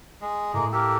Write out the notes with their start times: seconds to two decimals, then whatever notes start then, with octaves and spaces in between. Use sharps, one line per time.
0.21 G#3
0.53 A2 G#3 A#3
0.72 A#3 G4 A4 E6 F6